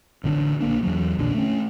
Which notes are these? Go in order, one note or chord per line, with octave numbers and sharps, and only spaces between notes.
A1 D3 C#4 D4
A#1 A#3 D4
E2 E3 F#3
A#1 A#2 D3 D4
A3 C#4